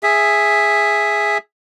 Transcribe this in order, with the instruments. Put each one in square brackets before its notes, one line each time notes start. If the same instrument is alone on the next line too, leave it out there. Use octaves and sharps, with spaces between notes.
[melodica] G#4 E5